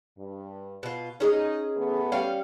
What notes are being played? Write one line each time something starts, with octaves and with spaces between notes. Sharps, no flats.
G2
B2 F4
C#4 D#4 G#4 A#5
E3 A3 B3
G3 C#4 F5